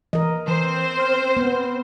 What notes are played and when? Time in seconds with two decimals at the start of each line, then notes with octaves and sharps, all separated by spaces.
0.13 E3 A#4 D#5
0.48 E3 C4 C5
0.99 F6
1.37 B3